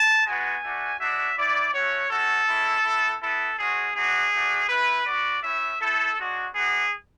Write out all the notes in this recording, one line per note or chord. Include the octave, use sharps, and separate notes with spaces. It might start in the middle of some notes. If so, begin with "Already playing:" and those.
Already playing: A5
G#3 B3 F#4 G#5
A3 D4 F#4
G#3 D4 F#4 E5
B3 E4 D5
A3 C#4 F#4 C#5
A3 C#4 F#4 A4
G#3 C#4 E4
B3 E4
B3 E4 A4
G#3 C#4 F#4 G#4
B3 D4 F#4 G#4
A3 D4 F#4
A3 E4 B4
B3 F#4 D5
A3 C#4 E4 E5
A3 E4 A4
G#3 D4 F#4
B3 D4 F#4 G#4